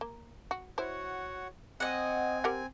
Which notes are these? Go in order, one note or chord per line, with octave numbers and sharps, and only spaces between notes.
A#3
F#4
E4 F#4 C5 C#5 F#5
C4 D#5 F#5 G#5
G4 A#4 F#5